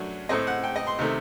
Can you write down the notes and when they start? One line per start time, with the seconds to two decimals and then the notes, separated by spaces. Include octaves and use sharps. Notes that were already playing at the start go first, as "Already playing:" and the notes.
Already playing: F#2 F#3 A3 D4
0.29 A2 A3 C4 D#5
0.47 F#5
0.64 G5
0.76 D#5
0.87 C6
0.99 C3 D#3 A3